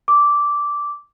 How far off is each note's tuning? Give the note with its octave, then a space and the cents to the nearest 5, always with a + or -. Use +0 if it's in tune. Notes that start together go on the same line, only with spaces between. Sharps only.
D6 -10